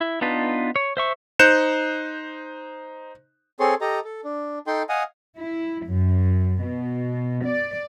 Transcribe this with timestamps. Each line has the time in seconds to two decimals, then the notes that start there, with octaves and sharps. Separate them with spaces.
0.01 E4
0.21 B3 D4 D#4 F4 B4
0.76 C#5
0.97 C5 E5 C#6
1.39 D#4 C5 F#6 G6 C#7 E7
3.60 C4 G#4 A4 C#5 C6
3.81 G4 A4 D#5 A#5
4.04 A4
4.24 D4
4.67 D#4 A4 G5 C6
4.89 D#5 F5 F#5 G#5 D#6
5.37 E4
5.86 F#2
6.62 B2
7.45 D5